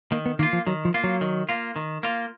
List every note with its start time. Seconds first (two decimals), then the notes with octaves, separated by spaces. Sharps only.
0.12 D#3 A#3
0.26 B3
0.39 D#3 A#3 F4
0.53 F3
0.66 D#3 F#3
0.85 F3
0.94 A#3 F4
1.04 F#3
1.21 D#3
1.49 A#3 F4
1.76 D#3
2.03 A#3 F4